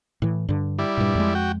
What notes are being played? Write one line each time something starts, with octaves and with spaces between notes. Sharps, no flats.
A2 E3
G2 D3
G3 E4 D5
G2 A#2
F2 D3 G#3
F#4 G5